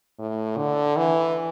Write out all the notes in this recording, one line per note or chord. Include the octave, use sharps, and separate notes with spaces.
A2
D3
E3